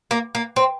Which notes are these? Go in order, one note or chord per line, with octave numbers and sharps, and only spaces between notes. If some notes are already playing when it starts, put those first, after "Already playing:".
A#3
A#3
C4